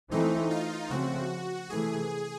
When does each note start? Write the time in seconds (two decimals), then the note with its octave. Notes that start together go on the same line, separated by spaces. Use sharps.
0.11 E3 A3 C4 D#4
0.51 F4
0.90 C#3 F3 A3 C4 F#4
1.69 C3 E3 A3 G#4